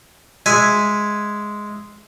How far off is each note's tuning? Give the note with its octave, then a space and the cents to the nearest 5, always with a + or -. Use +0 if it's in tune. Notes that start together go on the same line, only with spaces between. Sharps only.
G#3 +0 E5 +0 G#5 +0